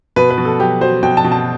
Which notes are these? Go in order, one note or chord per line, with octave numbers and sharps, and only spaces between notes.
B2 B4
B4
B2
A4
F#3 G4
F#3 C5
B2 G5
A5
B2
A5